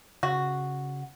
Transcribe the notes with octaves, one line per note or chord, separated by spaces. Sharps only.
C#3 F#4